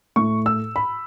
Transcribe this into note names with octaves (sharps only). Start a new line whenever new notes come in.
A2 A3 C#6
E6
B5